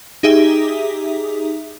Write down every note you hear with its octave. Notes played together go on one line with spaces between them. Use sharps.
D#4 G4 G#4 E5